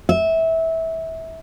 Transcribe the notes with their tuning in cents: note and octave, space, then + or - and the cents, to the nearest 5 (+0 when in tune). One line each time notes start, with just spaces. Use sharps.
E5 -20